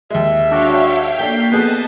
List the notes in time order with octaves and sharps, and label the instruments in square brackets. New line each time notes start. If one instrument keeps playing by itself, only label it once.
[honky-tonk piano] D#2 G#3 [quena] E5
[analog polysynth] D4 F#4 [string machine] C#5 F5 G5
[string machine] A#3 [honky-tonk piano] D4 A4 G5 [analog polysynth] G6 B6 C7
[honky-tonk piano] B3 G#4 A4 [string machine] D#5 A5 [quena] F#6